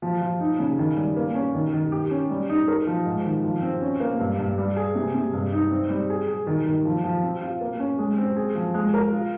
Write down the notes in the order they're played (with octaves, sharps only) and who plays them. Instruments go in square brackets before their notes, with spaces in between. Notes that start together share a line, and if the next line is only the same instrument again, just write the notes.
[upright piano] F3
F3
D#4
C#3
D#3
G3
A#3
C#4
D#3
D#3
G4
C#4
G3
D#4
A#4
F3
G#2
D#3
F3
C4
C#4
A#3
G2
G2
G3
G#4
C3
C3
G2
D#4
C4
G3
G#4
G#4
D#3
D#3
F3
F3
C4
F4
A#3
C#4
G#3
C4
G#4
F3
G#3
A#4
F4